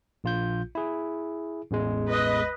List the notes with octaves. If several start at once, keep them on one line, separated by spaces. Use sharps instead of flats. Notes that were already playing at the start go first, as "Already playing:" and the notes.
A#1 F4 G6
E4 G#4
A1 E2 G#3
B4 D#5